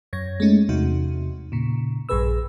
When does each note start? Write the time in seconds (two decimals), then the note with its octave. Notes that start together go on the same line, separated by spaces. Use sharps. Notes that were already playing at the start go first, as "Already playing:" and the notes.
0.13 F#2 C#5 G#6 A#6
0.40 G#3 A3 C#4 D#4
0.69 E2 C3 D#4 F#4
1.52 A#2 C#3
2.09 A#1 G2 G#4 B4 E6